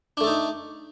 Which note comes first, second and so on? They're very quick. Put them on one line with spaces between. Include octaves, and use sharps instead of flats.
D4 A3 A4 D#4